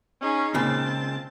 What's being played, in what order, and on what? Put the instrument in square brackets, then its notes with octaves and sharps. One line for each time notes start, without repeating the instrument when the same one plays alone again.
[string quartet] C#4 D#4 G#4
[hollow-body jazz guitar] C#2 A#2 C#3 [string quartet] C4 A5